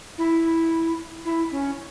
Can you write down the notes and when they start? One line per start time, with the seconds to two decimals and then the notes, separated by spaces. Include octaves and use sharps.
0.18 E4
1.25 E4
1.52 C#4